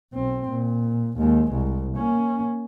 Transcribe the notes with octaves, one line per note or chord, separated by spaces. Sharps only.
B1 C4
A#2
D#2 G#3
C2
A#3 C#4